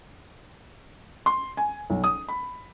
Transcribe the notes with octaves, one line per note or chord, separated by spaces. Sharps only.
C6
G#5
B1
D#6
B5